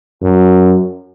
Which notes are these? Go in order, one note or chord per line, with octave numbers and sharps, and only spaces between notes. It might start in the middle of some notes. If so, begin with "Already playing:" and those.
F#2